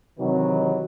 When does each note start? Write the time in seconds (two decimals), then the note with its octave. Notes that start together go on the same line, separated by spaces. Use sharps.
0.19 C3 D#3 E3 F#3